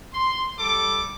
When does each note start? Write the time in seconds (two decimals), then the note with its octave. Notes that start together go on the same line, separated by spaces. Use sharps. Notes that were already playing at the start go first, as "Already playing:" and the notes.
0.14 C6
0.59 G3 A4 D6